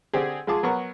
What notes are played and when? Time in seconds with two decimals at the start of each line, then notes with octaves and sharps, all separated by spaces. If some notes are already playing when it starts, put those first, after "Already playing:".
0.13 D3 C4 G4 G#4
0.47 G#3 F4 G#4 A5 D6
0.63 F#3 B3 A#4 C#6